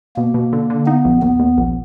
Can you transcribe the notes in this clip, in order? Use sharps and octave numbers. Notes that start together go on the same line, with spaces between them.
B2 A#3
B2
D3
D3
B3 D#4
A#1
D#2 B3
D#2
A#1